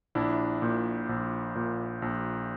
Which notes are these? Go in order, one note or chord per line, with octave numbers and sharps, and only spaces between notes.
A#1 D4 E4
A#2
A#1
A#2
A#1